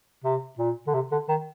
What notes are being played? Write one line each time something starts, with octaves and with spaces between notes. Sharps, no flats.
C3
A#2
D3
C3
D3
D#3